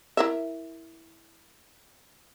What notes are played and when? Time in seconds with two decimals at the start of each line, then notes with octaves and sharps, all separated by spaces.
0.17 E4 A#4 E5